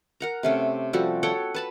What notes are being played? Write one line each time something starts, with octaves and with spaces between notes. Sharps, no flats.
A#4 F#5 A#5
C3 A3 C#4
F3 G3 F#4 A4
A4 C#5 F#5 G5
B4 A5 B5